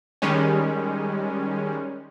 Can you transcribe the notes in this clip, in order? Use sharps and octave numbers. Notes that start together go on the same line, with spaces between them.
D#3 G3 G#3 C#4